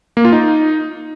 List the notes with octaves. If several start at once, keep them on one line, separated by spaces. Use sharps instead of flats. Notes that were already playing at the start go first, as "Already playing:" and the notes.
A#3
F4
D#4